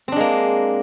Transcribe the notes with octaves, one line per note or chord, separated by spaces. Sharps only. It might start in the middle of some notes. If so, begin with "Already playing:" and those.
G#3 A#3 C4 D4